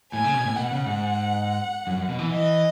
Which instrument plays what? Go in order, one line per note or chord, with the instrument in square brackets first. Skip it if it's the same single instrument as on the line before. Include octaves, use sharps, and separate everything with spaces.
[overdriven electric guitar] A2 [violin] G#5
[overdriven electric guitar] C#3
B2
A2
[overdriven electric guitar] B2 [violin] F#5
[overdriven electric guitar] C#3
G#2
F#2
F#2
B2
E3
[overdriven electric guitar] E3 [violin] D#5